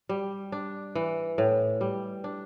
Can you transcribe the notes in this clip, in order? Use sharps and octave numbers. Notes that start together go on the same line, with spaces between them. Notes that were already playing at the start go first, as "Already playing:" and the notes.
G3
D4
E3
A2
G3
D4